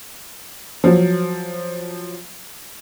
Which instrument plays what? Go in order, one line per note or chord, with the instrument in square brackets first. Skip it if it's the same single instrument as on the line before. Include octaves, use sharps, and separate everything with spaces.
[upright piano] F3 F#3